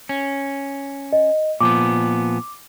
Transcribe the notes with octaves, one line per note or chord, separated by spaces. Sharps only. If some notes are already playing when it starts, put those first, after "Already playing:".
C#4
D#5
A#2 F3 B3 D6